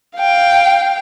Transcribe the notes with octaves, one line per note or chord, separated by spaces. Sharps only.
F5 G5